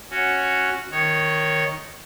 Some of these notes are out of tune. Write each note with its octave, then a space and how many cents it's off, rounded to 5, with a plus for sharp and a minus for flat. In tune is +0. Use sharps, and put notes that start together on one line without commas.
C#4 +0 F#4 +0
D#3 +0 C#5 +0